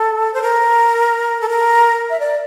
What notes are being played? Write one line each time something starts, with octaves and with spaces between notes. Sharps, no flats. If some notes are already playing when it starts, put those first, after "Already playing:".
Already playing: A4
C5
A#4
A4
A#4
E5
D5